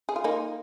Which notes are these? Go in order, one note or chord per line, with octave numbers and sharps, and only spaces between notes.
G#4
F4
A#3 D#4